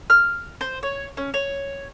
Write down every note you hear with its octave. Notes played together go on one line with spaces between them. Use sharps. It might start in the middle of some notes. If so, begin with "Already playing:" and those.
F6
C5
C#5
C#4
C#5